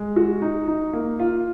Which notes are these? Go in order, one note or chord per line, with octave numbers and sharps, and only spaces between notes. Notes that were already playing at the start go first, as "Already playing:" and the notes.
Already playing: G#3
F#4
D#4
D#4
A#3
F4